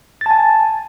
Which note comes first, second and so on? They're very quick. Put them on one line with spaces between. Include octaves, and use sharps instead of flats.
A6 A5 G#5